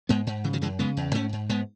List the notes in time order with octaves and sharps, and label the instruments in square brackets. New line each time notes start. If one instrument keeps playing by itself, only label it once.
[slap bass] G#2 G#3 B3
G#2
C#3 E3
D#3 F#3
F#2 E3 G#3
C#3 G#3 B3
E2
G#2 A3 C#4
G#2
G#2 G#3 B3